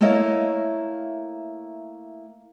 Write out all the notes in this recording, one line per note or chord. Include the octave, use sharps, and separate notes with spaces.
A3 A#3 E4 C#5 D#5 F5